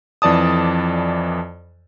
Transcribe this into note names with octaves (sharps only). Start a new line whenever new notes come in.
F2 E3 D5 A5 D#6